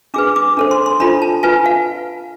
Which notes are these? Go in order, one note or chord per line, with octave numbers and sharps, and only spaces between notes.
D4 G#4 B4 D6
D6
D4 A4 C5
C6
C6
D4 F4 A4 C5 B5
A5
F4 B4 G#5
F5